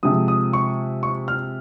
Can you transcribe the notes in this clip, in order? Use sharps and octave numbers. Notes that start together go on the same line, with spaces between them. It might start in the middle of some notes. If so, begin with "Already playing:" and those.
C3 F3 G#3 D#6
D#6
C#6
C#6
F6